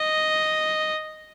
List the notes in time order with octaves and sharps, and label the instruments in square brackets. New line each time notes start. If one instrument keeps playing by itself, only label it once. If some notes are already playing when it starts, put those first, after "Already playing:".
Already playing: [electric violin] D#5